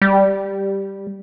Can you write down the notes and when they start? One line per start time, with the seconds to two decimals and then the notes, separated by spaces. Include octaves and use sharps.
0.02 G3